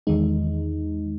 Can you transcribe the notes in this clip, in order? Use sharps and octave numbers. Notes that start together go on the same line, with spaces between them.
E2 D#3 G#3 D#4